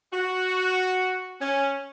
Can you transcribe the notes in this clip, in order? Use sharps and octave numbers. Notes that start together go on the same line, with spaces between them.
F#4
C#4